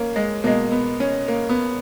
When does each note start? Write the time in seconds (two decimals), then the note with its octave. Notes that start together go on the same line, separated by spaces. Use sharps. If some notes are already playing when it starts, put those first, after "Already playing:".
Already playing: A#3 C#4
0.16 G#3
0.44 B2 G#3 A#3
0.72 B3
1.00 C#4
1.28 A#3
1.49 B3